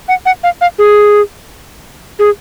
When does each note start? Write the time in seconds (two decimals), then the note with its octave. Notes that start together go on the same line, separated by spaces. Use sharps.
0.08 F#5
0.26 F#5
0.43 F5
0.61 F5
0.78 G#4
2.19 G#4